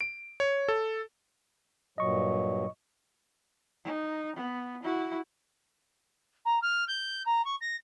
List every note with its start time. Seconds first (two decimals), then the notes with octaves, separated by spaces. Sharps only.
0.01 D7
0.40 C#5
0.68 A4
1.98 G2 A#2 F#3 D#5 C#6
3.85 D#4
4.36 B3
4.83 E4 F#4
6.45 A#5
6.62 F6
6.87 G6
7.26 A#5
7.44 C#6
7.61 A#6